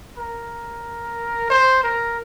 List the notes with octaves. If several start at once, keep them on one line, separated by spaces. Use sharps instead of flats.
A#4
C5
A#4